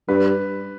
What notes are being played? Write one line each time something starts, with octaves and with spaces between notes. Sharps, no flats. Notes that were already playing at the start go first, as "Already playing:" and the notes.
G2 B4